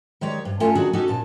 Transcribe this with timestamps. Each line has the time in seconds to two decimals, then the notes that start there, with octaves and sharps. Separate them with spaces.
0.21 D#3 G#3 G4 C#5 D5
0.45 G2
0.60 A3 C#4 F4 A4 G#5 A5
0.75 D#3 D4 F#4 G#4
0.93 C#4 D#4 F#4 G4 A4
1.08 A#2 A5